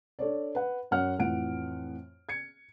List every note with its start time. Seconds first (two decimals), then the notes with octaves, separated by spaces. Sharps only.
0.19 D4 A4 C#5 D5
0.55 B4 F#5
0.91 F#2 C#4 C#5 F#5 F6
1.19 F2 A2 E3 F#5 D7
2.29 G#6 C#7